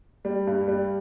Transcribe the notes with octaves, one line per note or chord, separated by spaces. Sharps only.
G3
G2
G3